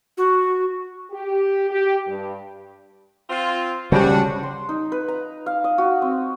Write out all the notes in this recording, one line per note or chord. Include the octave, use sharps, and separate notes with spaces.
F#4
G4
G4
G2
C4 F4
C#3 G3 D4 F#4 G4 C5
C6
D#4
B4
A#5
F5
D#5
F#4
C4